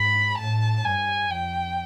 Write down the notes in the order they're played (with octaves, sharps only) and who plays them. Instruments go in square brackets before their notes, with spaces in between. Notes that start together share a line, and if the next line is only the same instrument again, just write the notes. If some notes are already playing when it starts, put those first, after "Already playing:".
Already playing: [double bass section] G#2 [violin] B5
[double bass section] A2 [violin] A5
[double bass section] G2 [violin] G#5
[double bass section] F2 [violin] G5